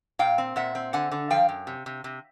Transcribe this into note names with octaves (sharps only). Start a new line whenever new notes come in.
A#2 F5 G5
C4
A#2 E5 F#5
C4
D3 F#5 G#5
D3
F3 F5 G5
F#2
C3
C3
C3